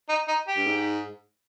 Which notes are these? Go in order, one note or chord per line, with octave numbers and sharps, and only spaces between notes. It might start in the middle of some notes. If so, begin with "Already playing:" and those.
D#4
D#4
G4
G2
G#2